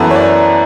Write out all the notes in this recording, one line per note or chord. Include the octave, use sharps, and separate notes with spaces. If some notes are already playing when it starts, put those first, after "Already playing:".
Already playing: F#2 E3 B3 A4
C#5
D5